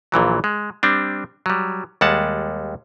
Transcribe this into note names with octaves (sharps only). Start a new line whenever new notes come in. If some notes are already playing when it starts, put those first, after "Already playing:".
A#1 A#2 E3 F#3
G#3
G3 C4 D4
F#3 G3
D#2 G3 G#3 F#5 A5